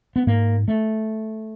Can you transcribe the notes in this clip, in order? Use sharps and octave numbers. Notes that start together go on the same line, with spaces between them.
B3
G#2 A#3
A3